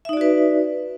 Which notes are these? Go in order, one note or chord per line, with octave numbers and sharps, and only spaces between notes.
D#4 F#4 B4 D5 E5